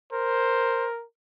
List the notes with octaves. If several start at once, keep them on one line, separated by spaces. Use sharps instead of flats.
A#4 C5